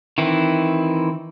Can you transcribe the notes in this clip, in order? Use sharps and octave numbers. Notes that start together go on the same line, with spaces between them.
D#3 E3 C4 E4